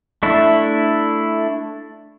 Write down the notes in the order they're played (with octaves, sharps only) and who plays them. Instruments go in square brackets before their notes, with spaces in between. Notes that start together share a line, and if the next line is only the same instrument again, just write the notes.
[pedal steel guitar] A3 D4 E4